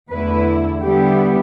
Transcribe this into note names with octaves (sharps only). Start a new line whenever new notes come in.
E2 D3 A3 E4 B4
D3 G3 B3 E4 G4